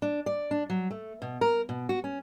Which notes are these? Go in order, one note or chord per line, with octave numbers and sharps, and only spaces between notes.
D4
D5
D4
F#3
A3
B2
A#4
B2
F#4
C#4